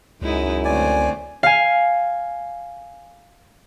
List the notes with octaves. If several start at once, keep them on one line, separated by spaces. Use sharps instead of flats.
C#2 F#2 G#3 D#4 E4
D3 A3 C4 D5 G#5
F5 G#5